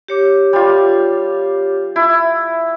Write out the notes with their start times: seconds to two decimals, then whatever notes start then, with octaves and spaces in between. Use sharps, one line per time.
0.08 G4 C#5 D6
0.53 G3 F4
1.96 E4